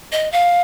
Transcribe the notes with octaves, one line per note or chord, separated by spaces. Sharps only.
D#5
F5